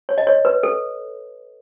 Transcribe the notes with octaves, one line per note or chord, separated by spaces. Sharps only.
C#5
D#5
C#5
B4
A4